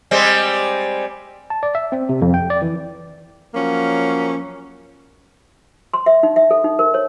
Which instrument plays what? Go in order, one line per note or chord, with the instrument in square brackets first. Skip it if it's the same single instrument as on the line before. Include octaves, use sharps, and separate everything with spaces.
[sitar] G3 G#3 C4
[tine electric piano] A5
D5
E5
C4
C3
F2
G5
D5
E3
[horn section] F3 F#3 A#3 C#4
[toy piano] C6
E5
D#4
E5
A4
D#4
A#4
C#5